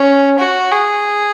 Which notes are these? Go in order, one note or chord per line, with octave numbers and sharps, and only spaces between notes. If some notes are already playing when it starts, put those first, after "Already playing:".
Already playing: C#4
F#4
G#4